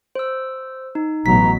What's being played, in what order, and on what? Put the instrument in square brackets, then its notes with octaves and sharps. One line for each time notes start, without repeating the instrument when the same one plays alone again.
[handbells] C5 E6
D#4
[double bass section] A1 B2 F#3 [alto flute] A#5 [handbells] B6